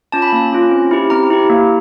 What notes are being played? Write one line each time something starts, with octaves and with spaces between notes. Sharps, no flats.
C#4 F4 A5
B5
A#3
C#4 F4
C4
E4 G4
C4 A#5
E4 G4
A#3